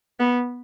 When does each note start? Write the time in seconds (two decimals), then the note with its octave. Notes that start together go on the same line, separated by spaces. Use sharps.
0.19 B3